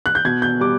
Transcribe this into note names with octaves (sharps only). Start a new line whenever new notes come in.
F#6
G6
B2 G#6
G6
G3 D6